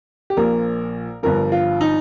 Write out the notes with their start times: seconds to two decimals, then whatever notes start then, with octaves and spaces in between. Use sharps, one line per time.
0.30 G4
0.37 A#1 A#2 F3 A#4
1.23 G1 G2 F3 A#4
1.52 F4
1.81 D#4